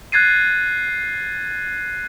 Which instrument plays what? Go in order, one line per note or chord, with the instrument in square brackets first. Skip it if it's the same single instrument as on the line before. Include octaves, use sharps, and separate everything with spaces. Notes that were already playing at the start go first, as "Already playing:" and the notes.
[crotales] F#6 G#6 A6 C7 D#7